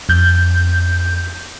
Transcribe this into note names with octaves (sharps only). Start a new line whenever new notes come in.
F2 G6